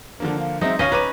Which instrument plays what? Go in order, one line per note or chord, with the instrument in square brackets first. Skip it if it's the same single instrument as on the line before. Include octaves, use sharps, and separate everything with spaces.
[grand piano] D3 F3 A#3 [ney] D4
[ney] F5
[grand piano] F#3 G#3 C4 [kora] D#4 [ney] E5
[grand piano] D1 F5 D#7 [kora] C#4 D#5 [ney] C#5
[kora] B4 [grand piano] A#5 D6 D#7